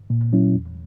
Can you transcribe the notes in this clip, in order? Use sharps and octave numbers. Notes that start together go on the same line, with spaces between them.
A#2
F#3 C#4 E4
E2